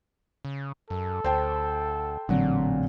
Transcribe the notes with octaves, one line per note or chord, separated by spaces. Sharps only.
C#3
F#2 A4
D2 C5 G5 A5
A1 A#2 D3 F#3 C4